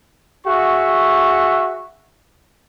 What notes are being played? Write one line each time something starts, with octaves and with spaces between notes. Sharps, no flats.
F#4 G#4 E5 C#6